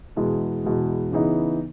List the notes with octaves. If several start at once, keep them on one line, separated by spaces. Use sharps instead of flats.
E2 B2 G#3
E2 B2 G#3
C#3 E3 B3 D#4